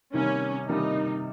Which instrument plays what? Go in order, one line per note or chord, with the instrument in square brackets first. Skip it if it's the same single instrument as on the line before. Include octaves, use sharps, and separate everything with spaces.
[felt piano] C3 D#3 G3 A#3 [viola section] C#4
[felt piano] C3 D#3 G3 A#3 [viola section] D#4